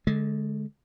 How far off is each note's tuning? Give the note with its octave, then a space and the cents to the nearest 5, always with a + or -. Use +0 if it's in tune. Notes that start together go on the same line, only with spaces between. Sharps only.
D3 +0 G#3 +25